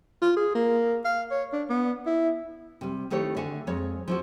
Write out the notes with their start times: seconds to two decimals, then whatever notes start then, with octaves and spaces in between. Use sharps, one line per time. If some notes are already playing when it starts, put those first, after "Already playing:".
0.22 F4
0.36 G#4
0.55 A#3
1.05 F5
1.31 C#5
1.53 D4
1.69 B3
2.06 E4
2.81 C3 G3
3.10 D#3 A3 E4 G4 C#5
3.36 D3 E5 F#5 G#5
3.67 F2 G#3 C#5
4.08 F3 E4 F#4